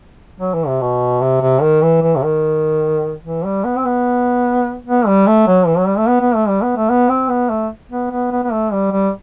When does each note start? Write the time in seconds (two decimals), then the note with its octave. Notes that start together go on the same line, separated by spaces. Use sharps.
0.40 F#3
0.54 E3
0.67 C3
0.81 B2
1.21 C3
1.41 C3
1.61 D#3
1.82 E3
2.02 E3
2.16 C3
2.23 D#3
3.24 E3
3.45 G3
3.65 B3
3.76 C4
3.85 B3
4.86 B3
5.07 G3
5.27 A3
5.47 F#3
5.67 E3
5.78 F#3
5.87 G3
5.98 A3
6.08 B3
6.21 B3
6.35 A3
6.48 G3
6.62 B3
6.76 A3
6.89 B3
7.09 C4
7.29 B3
7.49 A3
7.91 B3
8.11 B3
8.32 B3
8.44 B3
8.52 A3
8.72 G3
8.91 G3